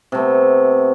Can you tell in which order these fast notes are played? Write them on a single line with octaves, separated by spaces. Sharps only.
C3 A3 B3